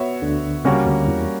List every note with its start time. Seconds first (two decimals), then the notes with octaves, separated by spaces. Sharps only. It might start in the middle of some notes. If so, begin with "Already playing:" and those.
Already playing: B3 F#4 C#5 E5
0.22 D2 D3
0.65 C#2 C#3 G3 A#3 C#4 F#4 A#4
0.87 D2 D3
1.08 E2 E3